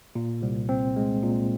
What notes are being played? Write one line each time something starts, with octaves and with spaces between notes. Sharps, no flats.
A#2
C2
C4
G#3
A#2